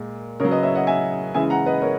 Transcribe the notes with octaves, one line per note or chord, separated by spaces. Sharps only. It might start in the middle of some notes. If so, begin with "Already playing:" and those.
Already playing: A#2 G#3
C#3 F#3 A#4 C#5
B4 D#5
C#5 E5
D#5 F#5
E5 G#5
C#3 E3 G#3 E5 G#5
F#5 A#5
B4 D#5
A#4 C#5